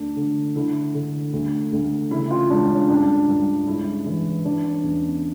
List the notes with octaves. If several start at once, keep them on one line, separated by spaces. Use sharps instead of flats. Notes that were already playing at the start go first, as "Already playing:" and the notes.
Already playing: D2 D4
D3
D3 E4
D3
D2
D2
C#3 E4
F4
C#2 D4
C#4
G2 D4
G2
C#2 E4
E3
E3 D4
C#4
E2